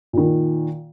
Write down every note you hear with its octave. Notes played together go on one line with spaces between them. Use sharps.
A#2 D#3